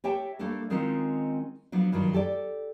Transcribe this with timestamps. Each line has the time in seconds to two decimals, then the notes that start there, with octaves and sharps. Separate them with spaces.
0.04 G4 C#5 E5 G5 A5
0.39 G3 A3 A#3 D4 A4
0.70 D#3 G#3 C4 C#4 D#4 F4
1.72 F3 F#3 B3 D4
1.92 G2 D#3 F3 F#3 D4
2.13 G4 A4 A#4 D5